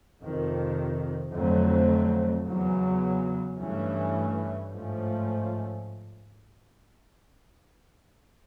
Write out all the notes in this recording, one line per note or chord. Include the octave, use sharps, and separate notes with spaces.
F2 C3 D#3
F2 D3 F#3 A3 C4
E2 C#3 F#3
G2 E3 A3 C#4
G#2 F3 A3 C#4